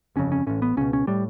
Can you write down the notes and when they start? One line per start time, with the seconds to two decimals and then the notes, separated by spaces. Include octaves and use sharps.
0.16 G1 F2 C#3 C#4
0.32 C#4
0.47 A1 A2 C#4
0.62 B3
0.77 C#2 B2 C#4
0.93 C#4
1.07 A2 G3